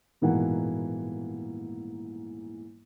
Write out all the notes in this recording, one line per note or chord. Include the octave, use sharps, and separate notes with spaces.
D#1 G#2 B2 E3 A#3 F#5